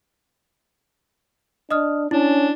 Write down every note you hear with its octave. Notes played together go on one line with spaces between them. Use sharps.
D4 D#5 D#6 F6
C#4 D4 E4